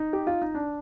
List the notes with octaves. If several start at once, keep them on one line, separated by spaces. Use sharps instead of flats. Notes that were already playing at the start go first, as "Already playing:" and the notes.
Already playing: D#4
G4
F4
D#4
D4